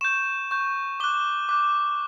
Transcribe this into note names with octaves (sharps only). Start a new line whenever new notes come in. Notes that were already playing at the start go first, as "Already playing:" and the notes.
C#6 G6 E7
C#6 G6
D6 F#6 G7
D6 F#6